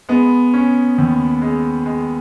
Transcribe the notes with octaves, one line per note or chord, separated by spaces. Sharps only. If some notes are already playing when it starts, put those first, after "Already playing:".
G#3 B3
C#4
D#2
G#3
G#3